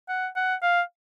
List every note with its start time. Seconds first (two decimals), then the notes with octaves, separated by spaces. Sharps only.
0.09 F#5
0.36 F#5
0.62 F5